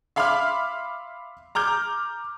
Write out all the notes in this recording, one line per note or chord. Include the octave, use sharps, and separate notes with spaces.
E5 F5 B5 C6 D6 F6
A#5 D6 F6 G6